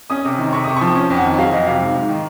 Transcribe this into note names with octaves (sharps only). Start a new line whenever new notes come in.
C#4 D#6
C3
D#3
C3 C#6
C3 D#6
C#6
F3
C#4
F2
F#5
D#3
F#3 F5
F2 D#5
C3 F5
G#2
G#2
D#3